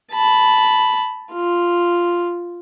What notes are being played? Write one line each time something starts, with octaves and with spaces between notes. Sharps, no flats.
A5 B5
F4